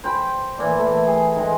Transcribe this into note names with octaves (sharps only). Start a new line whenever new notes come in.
C5 G5 B5
A#2 E3
A3
G#4
D#3 G#3